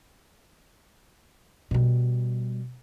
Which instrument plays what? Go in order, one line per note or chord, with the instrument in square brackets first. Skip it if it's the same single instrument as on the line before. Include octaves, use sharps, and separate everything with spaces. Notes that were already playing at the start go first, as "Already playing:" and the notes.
[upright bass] B2 G3